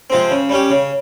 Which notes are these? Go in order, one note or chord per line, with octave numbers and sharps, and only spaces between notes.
C3 F3 G#3 C4
C#3
G3 C#4 G4
C#3